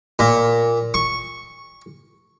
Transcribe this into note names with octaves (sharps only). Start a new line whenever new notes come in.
A#2
C#6